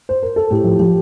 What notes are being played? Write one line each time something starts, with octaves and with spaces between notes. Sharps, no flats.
C5
A#4
A4
A2 G4
F3
F3 G4